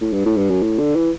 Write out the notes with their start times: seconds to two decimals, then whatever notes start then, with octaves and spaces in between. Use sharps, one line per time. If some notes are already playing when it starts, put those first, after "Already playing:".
0.01 A2
0.13 G2
0.25 A2
0.38 G2
0.50 F#2
0.63 A2
0.79 D3
0.96 E3